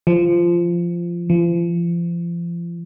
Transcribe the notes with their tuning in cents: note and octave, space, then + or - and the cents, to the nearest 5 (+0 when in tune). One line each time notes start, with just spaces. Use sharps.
F3 -15
F3 -35